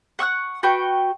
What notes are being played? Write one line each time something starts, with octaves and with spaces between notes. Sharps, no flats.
F#5 C#6 E6 F#6
F#4 B4 G5 C#6